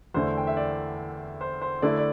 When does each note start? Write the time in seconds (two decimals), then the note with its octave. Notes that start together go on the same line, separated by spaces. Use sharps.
0.14 E2 D3 A3 C5
0.38 G5
0.47 E5
0.57 D5
1.41 C5
1.62 C5
1.82 D3 A3 E4 D5
1.97 D5